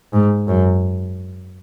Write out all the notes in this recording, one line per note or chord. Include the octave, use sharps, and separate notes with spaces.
G#2
F#2